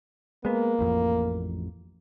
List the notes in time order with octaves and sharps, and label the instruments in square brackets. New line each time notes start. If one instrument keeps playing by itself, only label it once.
[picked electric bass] G#3 B3 [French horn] A#3
[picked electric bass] A1 F2